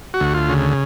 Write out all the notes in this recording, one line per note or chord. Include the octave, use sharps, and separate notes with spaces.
F#4
D2
F4
C#3